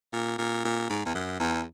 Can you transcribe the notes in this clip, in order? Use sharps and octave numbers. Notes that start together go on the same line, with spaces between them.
A#2
A#2
A#2
G#2
E2
F#2
E2